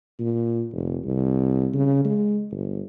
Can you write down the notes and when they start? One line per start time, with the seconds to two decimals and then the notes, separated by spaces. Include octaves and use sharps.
0.19 A#2
0.72 F1
1.04 C2
1.73 C#3
2.05 G#3
2.51 G1